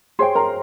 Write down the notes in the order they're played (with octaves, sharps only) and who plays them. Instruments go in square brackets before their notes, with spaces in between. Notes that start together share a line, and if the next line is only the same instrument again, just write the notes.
[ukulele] G#4 C#5 G5 [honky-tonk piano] C5 C6
[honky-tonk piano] A#4 A#5